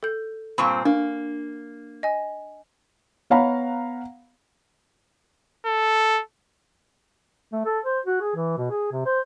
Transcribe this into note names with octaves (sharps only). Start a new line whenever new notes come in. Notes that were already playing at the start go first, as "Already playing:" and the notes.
A4 G6
G2 A#2 C4 B5 C#6
A#3 D4
D#5 G#5
B3 C#5 F5 F#5 A#5 B5
A4
A3
A4
C5
F#4
G#4
E3
B2
G#4
C3
C5